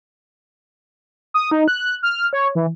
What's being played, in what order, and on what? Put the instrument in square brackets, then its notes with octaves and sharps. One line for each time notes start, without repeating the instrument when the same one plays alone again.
[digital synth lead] D#6
D#4
F#6
F6
C#5
E3